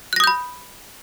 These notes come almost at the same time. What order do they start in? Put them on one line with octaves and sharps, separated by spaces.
F#6 A#6 D#6 G6 B5